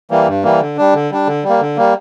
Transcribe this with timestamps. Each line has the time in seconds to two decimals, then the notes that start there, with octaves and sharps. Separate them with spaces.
0.11 E3 G3 A#3
0.27 G2
0.43 E3 G3 A#3
0.61 D3
0.77 G3 D4
0.94 D3
1.11 G3 D4
1.27 D3
1.44 G3
1.49 A#3
1.61 D3
1.77 G3 A#3